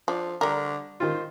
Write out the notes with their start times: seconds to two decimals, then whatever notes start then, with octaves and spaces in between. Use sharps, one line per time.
0.08 F3 D4
0.41 D3 G3 A#4
1.00 D#3 F4 C5